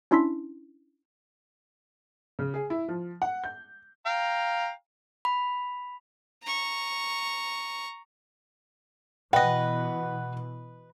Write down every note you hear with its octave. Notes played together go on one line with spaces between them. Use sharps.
C#4 D4 E4 C6 E6 B6
C#3
G#4
E4
F3
F#5
G6
F5 G5 A#5
B5
A#5 C#6
B2 E3 B4 D#5 F#5 G5